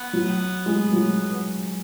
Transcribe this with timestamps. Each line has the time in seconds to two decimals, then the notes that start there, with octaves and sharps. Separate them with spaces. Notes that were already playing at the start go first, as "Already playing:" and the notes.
Already playing: B3
0.13 F#3
0.66 G#3
0.93 F#3